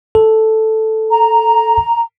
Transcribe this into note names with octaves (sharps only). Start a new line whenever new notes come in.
A4
A#5